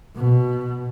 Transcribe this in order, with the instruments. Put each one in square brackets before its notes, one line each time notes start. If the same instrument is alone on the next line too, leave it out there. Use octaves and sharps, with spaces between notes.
[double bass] B2